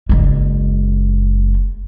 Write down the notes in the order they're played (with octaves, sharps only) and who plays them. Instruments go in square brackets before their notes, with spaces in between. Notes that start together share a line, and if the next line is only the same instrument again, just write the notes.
[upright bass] F#1 G#3